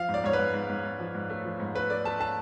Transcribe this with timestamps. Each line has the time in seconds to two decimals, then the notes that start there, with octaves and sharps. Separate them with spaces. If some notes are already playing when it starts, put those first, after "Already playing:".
Already playing: F3 F5
0.09 G#2
0.14 D5
0.24 G#2 C#5
0.33 B4
0.39 G#2
0.54 G#2
0.69 G#2
0.84 G#2
1.00 F3
1.15 G#2
1.30 A3
1.44 F3
1.60 G#2
1.75 A3 B4
1.90 A3 D5
2.05 A3 A5
2.20 A3 A5